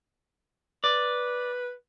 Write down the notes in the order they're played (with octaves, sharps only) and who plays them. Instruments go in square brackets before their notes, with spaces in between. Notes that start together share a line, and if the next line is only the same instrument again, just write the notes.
[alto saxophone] B4 [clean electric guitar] D5